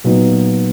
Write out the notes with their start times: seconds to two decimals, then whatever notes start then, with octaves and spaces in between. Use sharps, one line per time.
0.04 A#2 F#3 B3 D#4